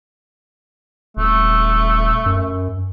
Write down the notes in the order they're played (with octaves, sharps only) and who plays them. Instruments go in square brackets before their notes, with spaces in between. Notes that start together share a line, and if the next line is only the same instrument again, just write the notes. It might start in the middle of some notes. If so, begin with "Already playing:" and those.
[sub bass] D#1 [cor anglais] A3
[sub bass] F#2